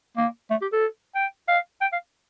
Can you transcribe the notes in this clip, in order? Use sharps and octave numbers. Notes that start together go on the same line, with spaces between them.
A#3
A3
G4
A4
G5
F5
G5
F5